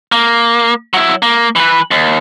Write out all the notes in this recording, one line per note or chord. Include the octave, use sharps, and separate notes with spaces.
A#3
F#3 E4
A#3
E3 B4
D#2